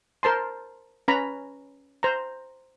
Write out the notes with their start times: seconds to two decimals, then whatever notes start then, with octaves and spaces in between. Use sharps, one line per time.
0.23 A#4 C5 A5 C6
1.08 C#4 B4 A#5 B5
2.03 C5 A#5